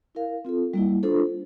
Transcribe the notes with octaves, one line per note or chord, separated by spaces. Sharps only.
E4 A#4 F5
C4 F4 A4
G3 A#3 E4
D4 F4 A4 C5